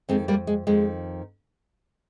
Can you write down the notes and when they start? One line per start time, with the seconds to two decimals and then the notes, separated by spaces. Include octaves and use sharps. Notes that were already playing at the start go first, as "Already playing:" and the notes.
0.09 F2 D#3 G#3 C4
0.28 G3 A#3
0.47 G#3
0.67 F2 D#3 G#3